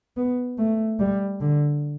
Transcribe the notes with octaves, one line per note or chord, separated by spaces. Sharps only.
B3
A3
G3
D3